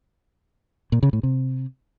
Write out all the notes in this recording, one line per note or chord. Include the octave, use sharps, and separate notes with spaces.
A#2
C#3
A2
C3